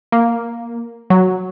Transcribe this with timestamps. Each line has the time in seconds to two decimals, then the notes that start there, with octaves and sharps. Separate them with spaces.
0.12 A#3
1.10 F#3